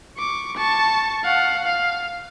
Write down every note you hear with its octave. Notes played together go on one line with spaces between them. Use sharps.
C#6 D6
A5 C#6
F5 F#5
F5